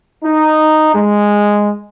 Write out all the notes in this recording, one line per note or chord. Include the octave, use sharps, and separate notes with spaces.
D#4
G#3